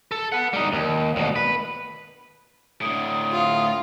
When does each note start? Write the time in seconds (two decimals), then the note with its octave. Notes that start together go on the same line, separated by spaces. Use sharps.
0.12 A4
0.32 B4 F#5
0.53 G3 D#4
0.72 D#2
1.16 D2 B2
1.36 B4
2.82 A2 D3 D#6
3.32 F4